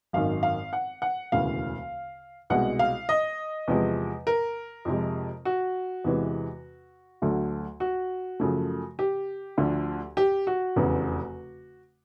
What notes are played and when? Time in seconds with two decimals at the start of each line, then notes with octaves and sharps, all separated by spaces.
0.13 G#1 F#2 D#3 F5
0.43 F5
0.73 F#5
1.02 F#5
1.32 E1 D2 C#3 E3 F5
2.50 C2 B2 G#3 F#5
2.79 F5
3.09 D#5
3.67 E2 C3 F3 G#3
4.27 A#4
4.85 F2 C3 F3 G#3
5.45 F#4
6.04 E2 C3 E3 G#3
7.22 D2 D3 F#3 A3
7.80 F#4
8.40 F#2 C#3 F3 A3
8.99 G4
9.57 D2 D3 F3
10.17 G4
10.47 F#4
10.76 F1 E2 C#3